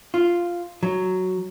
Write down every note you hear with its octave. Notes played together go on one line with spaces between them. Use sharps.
F4
F#3